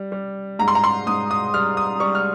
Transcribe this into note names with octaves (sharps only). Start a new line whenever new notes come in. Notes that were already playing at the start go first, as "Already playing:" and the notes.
Already playing: G3
G3
G#2 A#5
C6
A#5
C6
G#2 D#6
D#6
G3 F6
D#6
G3 C#6
F6